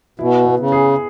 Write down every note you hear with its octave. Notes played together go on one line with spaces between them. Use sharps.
B2 E4
B3
C#3
G#4